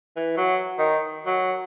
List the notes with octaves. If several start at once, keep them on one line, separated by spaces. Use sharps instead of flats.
E3
F#3
D#3
F#3